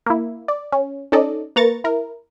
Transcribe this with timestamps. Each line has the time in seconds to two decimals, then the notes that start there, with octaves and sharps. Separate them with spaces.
0.06 A#3 E4
0.48 D5
0.72 C#4
1.12 C#4 D#4 A4 D5 D#5
1.56 A#3 B4 A#5 C#6 A6
1.84 E4 A#4